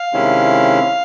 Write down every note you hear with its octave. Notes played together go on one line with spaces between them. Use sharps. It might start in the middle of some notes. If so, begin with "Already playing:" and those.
Already playing: F5
C3 D#3 G#3 C#4 E4